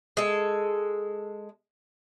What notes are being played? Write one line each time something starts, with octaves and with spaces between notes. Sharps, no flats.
G#3 A4